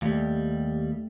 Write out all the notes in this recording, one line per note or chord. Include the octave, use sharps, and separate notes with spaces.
D#2 G3 A3